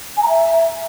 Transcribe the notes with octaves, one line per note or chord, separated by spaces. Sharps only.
G#5
A#5
E5